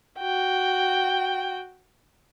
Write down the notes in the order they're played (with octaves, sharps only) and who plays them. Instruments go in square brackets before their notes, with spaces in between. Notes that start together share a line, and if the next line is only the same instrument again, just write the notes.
[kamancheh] F#4 G5